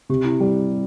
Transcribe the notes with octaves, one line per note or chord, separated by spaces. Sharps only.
C3 G4
E4
G3